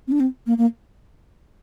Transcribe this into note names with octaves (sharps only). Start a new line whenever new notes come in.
C4
D4
C4
A#3
A#3